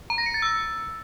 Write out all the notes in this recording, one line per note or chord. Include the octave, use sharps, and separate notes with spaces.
A#5
A#6
C#7
A6
E6